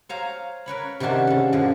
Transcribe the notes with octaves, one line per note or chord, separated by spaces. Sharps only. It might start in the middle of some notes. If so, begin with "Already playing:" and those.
C5 C#5 F5 G#5 A#5
A#4 B4 C#5 B5
C3 D#3 C#4 D4 F#4 C5
C#3 A4
F#2 A#2 D3 F3